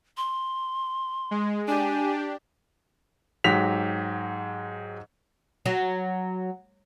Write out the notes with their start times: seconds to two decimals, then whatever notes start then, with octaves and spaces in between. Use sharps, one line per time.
0.17 C6
1.31 G#3
1.68 D4 G4 G#5
3.44 G#2 F#3 G4 B6 F7
5.66 F#3